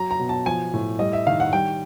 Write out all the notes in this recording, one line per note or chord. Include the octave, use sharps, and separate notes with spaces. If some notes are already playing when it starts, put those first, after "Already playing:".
Already playing: F#3 A#5
A#5
B2
A5
F3 G#5
A2
G3 D#5
E5
D#3 F5
F#5
G3 G5